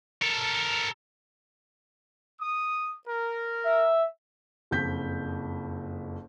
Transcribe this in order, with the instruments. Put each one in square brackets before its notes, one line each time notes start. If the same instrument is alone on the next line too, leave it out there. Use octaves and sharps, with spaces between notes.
[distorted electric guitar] A4 A#4
[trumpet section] D#6
A#4
[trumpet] E5
[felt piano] F#1 F2 G6 B6